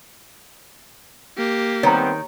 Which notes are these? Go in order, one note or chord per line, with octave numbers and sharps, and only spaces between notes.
A#3 G4
D#3 G3 B3 C4 C#5 A#5